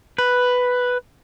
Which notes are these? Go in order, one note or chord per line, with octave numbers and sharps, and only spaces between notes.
B4